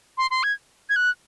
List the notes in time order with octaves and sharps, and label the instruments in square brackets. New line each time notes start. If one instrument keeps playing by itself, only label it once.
[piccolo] C6
C6
G#6
G#6
F#6